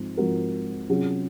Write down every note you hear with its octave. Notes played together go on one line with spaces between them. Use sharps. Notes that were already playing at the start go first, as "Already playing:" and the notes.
Already playing: G#2 F3 C4
G#2 F3 C4 F#4 A#4
C3 F#3 C#4 F4 G#4